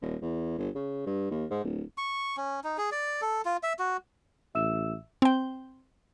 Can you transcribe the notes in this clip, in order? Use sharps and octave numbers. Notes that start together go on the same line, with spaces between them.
D#1
E2
G1
C#3
G2
D#2
G#2
D1
C#6
C#4
D#4
G#4
D5
A4
F4
E5
F#4
A1 E5 E6 E7
C4 G5